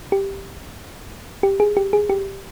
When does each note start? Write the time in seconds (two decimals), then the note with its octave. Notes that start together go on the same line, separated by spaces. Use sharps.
0.12 G4
1.43 G4
1.60 G#4
1.77 G4
1.93 G#4
2.10 G4